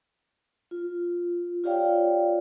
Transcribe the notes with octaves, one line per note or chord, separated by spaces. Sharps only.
F4
F4 G4 C#5 D5 F5 G5